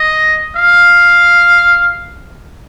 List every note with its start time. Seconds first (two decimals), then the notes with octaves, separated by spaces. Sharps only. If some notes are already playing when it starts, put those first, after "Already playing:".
Already playing: D#5
0.56 F5